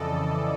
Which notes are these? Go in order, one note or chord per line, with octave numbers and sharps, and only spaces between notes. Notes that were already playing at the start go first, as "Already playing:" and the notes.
Already playing: F2 C#3 E3 A4 D5 D#5